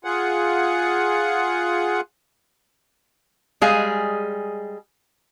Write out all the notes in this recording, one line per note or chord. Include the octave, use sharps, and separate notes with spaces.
F4 G#4 F#5
G3 G#3 G#4 D#5 F5